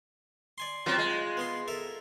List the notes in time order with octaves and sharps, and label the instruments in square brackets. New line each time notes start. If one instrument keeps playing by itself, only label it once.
[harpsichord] D5 G#5 C6
[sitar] F#3 C4 [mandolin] F4
[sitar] G#3
[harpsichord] B3 G#4 C6
A4 A#4 E5